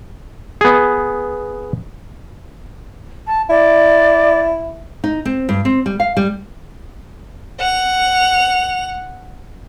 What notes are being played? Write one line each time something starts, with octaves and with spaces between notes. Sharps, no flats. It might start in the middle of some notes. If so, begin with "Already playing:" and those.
B3 G#4
A5
E4 D5
D#4
C4
G2
C4
G3
F5
G3
F#5 F7